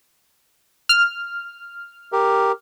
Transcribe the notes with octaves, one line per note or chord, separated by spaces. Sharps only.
F6
G4 A#4